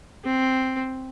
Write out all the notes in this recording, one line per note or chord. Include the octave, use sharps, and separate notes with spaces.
C4